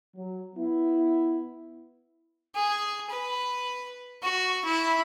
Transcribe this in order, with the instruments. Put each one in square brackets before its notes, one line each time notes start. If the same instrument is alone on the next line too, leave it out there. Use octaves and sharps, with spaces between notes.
[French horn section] F#3
B3 E4
[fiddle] G#4
B4
F#4
E4